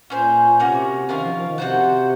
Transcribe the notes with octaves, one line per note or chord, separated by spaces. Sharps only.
A#2 C#4 G#4 C5
A#2
C3 A#3 C#4 F#4 A#4
D#3 C#4 F4 A#4 F5
F3
F3
D#3
C3 F#4 C5 F#5